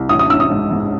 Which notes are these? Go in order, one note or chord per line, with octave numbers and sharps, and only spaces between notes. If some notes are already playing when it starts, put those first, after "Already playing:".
Already playing: C2
A1 D#6
D#6
A1 E6
D#6
G#2
G#2